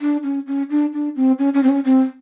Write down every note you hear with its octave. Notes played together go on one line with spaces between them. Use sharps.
D4
C#4
C#4
D4
D4
C4
C#4
C#4
C4
C#4
C4